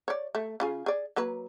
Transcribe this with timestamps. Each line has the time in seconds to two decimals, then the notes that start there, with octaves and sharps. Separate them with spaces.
0.08 C#5 D5
0.35 A3
0.60 C#3 F4 G#4
0.86 G#4 D5
1.16 F#3 A#3 B4